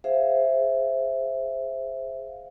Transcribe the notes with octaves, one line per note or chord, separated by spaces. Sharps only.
G#4 C5 E5 F5